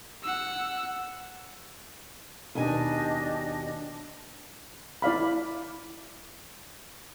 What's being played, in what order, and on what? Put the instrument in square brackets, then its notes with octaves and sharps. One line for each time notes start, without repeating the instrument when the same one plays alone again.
[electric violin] F#5 E6
[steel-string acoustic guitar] D#2 B2 G#5 [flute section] D4 G4 D#5
[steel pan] E4 D5 F5 B5